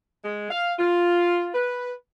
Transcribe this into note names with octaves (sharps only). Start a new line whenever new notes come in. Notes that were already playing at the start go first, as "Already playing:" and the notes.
G#3
F5
F4
B4